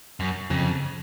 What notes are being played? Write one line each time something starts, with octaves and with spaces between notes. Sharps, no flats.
F#2
F2 C#3